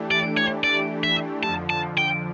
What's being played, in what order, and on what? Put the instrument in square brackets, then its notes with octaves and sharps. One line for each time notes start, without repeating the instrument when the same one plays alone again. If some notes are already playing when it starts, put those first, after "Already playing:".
Already playing: [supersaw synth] E3 A3 D4 G4
[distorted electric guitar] D5
C#5
D5
E5
[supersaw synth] F2 D3 F3 [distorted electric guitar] A5
[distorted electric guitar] A5
G5